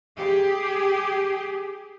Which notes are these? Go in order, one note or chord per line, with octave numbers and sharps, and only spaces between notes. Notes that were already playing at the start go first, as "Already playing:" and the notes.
G4 G#4